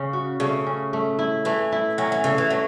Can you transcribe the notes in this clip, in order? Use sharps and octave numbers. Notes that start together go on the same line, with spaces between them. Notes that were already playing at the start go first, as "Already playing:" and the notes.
Already playing: C#3 C#4
F#4
C#3 A3
C#4
A3
E4
E3 A3
E4
F#3 C#4
E3
C#3 A4
E3
F#3 A3